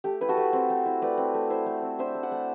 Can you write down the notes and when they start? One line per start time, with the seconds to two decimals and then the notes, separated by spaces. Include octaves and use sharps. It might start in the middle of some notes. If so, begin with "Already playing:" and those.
0.04 A3 G4
0.21 E4 B4
0.29 F#4 A4
0.37 A3
0.53 C4
0.70 A3
0.86 E4
1.02 A3 B4 D5
1.17 C4
1.34 A3
1.50 E4 C5 E5
1.66 A3
1.82 C4
1.99 D4 C5 E5
2.15 A3
2.23 D5 F#5
2.32 A3